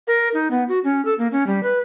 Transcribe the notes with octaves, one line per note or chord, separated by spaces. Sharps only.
A#4
D#4
B3
F#4
C#4
A4
A#3
C#4
G3
B4